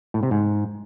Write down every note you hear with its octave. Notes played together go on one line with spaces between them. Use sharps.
A2
C3
G#2